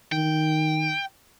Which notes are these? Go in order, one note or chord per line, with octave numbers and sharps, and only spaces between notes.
D#3 G5